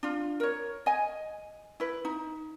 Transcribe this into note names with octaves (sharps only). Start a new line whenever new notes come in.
D4 F4
A#4 C#5
D#5 G#5
E4 B4
D#4